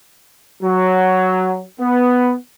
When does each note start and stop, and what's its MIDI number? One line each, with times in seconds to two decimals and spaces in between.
0.63 1.62 54
1.80 2.33 59